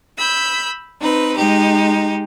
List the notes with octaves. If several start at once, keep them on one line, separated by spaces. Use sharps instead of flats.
B5 E6 G6
C4 D#4 B4
G#3 D#4 G4